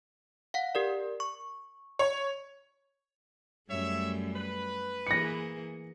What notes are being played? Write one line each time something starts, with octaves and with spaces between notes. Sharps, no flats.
F5 F#5
G4 A#4 D5
C#6
C#5
F#2 G3 A3 C#5 E5
B4
E3 A#3 G#4 A#6 C#7